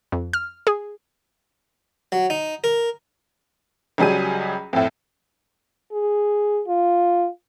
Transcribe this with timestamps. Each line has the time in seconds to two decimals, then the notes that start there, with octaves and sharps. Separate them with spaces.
0.12 F2
0.33 F6
0.67 G#4
2.12 F#3
2.30 D#4
2.64 A#4
3.98 C#2 F#3 G3 G#4 D#7
4.73 F2 A2
5.92 G#4
6.67 F4